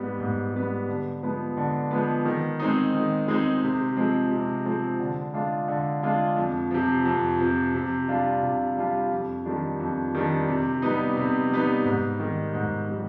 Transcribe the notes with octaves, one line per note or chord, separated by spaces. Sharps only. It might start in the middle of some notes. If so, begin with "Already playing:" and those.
Already playing: G#2 G3 B3
G#2
G3 B3
D3
F3 G#3 B3
D3
F3 G#3 B3
D#3
G#3 C4 D#4
D#3
G#3 C4 D#4
C3
F3 G#3 C4
C3
F3 G#3 C4
D3
G#3 D4 F4
D3
G#3 D4 F4
F2
C3 F3
F2
C3 F3
C3
G3 D4 F4
C3
G3 D4 F4
F2
D#3 G3 D4
F2
D#3 G3 D4
C3
G3 B3 D#4
C3
G3 B3 D#4
G#2
D#3 G3
G#2
D#3 G3